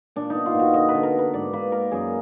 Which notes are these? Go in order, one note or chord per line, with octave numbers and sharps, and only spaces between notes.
A#2 D4
B3 D#4
F4
A#2 F#4
D3 D#5
B4
D3
A#4
B3
B4
G#2 D5
A#3 B4
A#3 A#4
F#2 G#4